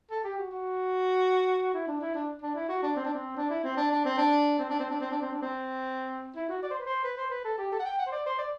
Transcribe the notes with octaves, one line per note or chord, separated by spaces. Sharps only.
A4
G4
F#4
F#4
E4
D4
E4
D4
D4
E4
F#4
D4
C4
D4
C4
D4
E4
C4
D4
D4
C4
D4
C4
D4
C4
D4
C4
D4
C4
D4
C4
E4
F#4
D5
C5
B4
C5
B4
C5
B4
A4
G4
A4
F#5
G5
F#5
C5
D5
C5
D5